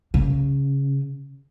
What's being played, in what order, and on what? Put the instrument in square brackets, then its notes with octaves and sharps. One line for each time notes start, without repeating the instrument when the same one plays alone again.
[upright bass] C#3